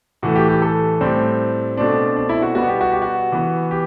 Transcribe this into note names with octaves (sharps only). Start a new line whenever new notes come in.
A2 E3 A3 F#4
G4
G4
A4
A2 G3 C4
B2 A3 C4 D4
D4
E4
F#4
B2 G3 B3 F#4
G4
F#4
G4
F#4
E3 B3
G4